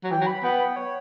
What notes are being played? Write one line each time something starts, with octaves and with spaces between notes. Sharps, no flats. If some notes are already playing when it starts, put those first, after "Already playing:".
F#3
E3 G5
F#3
B5
B3 G5
C#5